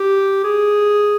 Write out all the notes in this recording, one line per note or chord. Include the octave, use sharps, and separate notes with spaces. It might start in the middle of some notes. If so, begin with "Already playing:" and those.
Already playing: G4
G#4